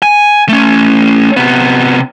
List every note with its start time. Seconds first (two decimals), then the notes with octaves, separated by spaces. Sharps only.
0.02 G#5
0.49 A3 C#4
1.37 C3 B3